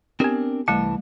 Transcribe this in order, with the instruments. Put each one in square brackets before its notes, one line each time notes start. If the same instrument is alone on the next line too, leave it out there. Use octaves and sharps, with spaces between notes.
[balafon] B3 G4 [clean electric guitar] C4 D4 A#4
[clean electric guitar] C2 E3 A5 [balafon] G3 A3